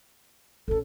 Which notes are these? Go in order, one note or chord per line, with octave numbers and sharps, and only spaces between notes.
A#1 C#4 A4